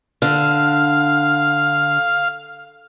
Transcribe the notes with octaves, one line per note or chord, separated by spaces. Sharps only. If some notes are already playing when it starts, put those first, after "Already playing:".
D3 F5